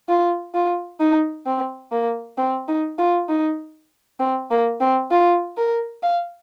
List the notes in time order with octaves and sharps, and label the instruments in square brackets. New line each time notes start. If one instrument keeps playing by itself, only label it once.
[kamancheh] F4
F4
D#4
C4
A#3
C4
D#4
F4
D#4
C4
A#3
C4
F4
A#4
F5